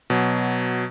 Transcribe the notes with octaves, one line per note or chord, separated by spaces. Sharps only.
B2 F#3